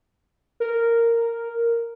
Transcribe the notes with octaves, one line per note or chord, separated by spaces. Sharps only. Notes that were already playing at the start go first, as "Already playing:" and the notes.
A#4